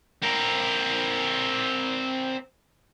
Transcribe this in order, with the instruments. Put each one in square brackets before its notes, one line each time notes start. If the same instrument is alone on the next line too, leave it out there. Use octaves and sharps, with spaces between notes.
[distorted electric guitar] C4 A#4